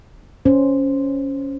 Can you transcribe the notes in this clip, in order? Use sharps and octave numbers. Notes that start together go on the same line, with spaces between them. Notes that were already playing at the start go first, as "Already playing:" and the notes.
C#4 C5